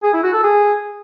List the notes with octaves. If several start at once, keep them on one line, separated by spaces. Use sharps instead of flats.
G#4
E4
F#4
A4
G#4